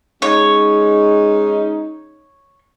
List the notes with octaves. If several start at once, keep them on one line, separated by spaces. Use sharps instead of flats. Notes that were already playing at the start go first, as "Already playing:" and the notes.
G#3 C#4 D#4 C#5